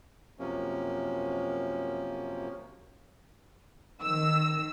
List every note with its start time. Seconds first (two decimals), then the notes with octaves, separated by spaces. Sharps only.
0.39 F#2 C3 F3 A#3 C#4
4.01 D#3 E6